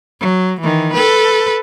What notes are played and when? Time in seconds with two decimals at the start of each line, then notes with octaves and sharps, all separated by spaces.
0.21 F#3
0.61 D#3 E3
0.93 A4 B4